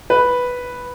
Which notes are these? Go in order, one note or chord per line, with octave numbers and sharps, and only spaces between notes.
B4